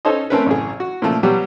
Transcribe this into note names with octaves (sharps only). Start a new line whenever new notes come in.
C#4 D#4 A4 C5 C#5 D#5
A3 C4 C#4 A#4 B4
A1 F#2 C#3 G#4
F#4
A#2 C#3 F3 A3
B2 F#3 G3 G4